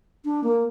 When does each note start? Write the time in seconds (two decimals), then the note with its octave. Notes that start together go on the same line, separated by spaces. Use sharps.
0.25 D4
0.44 A#3